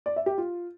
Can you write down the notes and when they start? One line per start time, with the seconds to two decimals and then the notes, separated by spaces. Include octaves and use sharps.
0.06 D5
0.16 E5
0.26 G4
0.38 F4